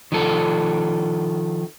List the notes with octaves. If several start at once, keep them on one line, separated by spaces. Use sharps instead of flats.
D#3 F3 A4